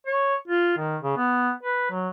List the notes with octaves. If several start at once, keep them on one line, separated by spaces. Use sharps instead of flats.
C#5
F4
D#3
C#3
B3
B4
F#3